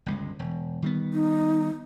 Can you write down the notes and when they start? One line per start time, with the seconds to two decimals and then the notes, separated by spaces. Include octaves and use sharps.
0.06 G1 C#2 G#3
0.39 E1
0.82 D#3 G3 B3
1.13 D#4